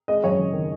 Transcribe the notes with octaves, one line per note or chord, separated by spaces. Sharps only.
G#3 D#5
F#2 C#5
F#1
D#3